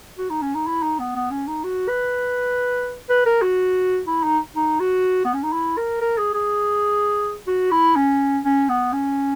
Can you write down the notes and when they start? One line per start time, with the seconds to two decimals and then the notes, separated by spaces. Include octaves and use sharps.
0.18 F#4
0.30 D#4
0.42 C#4
0.54 D#4
0.67 E4
0.82 D#4
0.99 B3
1.15 B3
1.31 C#4
1.47 D#4
1.64 F#4
1.88 B4
3.09 B4
3.26 A#4
3.42 F#4
4.07 E4
4.23 D#4
4.56 D#4
4.80 F#4
5.25 B3
5.34 C#4
5.43 D#4
5.52 E4
5.77 A#4
6.01 A#4
6.18 G#4
6.34 G#4
7.47 F#4
7.71 E4
7.96 C#4
8.44 C#4
8.69 B3
8.93 C#4